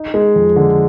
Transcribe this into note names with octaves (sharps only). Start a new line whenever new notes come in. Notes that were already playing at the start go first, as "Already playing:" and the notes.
Already playing: D#4
G#3
F2
D3